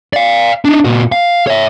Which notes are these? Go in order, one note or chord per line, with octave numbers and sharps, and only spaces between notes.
D5 F5
D4 D#4
A#2 F#4
F5
C#5 E5